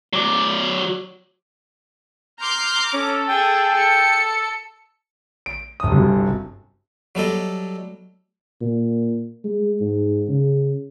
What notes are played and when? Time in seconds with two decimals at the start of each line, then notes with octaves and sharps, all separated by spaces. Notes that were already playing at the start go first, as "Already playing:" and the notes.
0.13 F#3 D5
2.40 A#5 C6 D6 F6 G6
2.93 C#4 A4
3.29 G#4 G5
3.77 C#7
5.46 D7
5.80 G1 D#6
5.92 C2 F#2
7.15 F#3 G3 A4 D#5
8.61 A#2
9.44 G#3
9.81 G#2
10.28 C#3